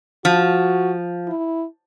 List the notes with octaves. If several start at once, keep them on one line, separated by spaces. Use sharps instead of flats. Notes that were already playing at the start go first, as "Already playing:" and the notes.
F3 F#4
E4